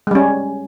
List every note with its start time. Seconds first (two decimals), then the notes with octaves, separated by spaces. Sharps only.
0.07 G#3
0.11 G3
0.15 C#4